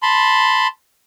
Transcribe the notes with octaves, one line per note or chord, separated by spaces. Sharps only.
A5 B5 C6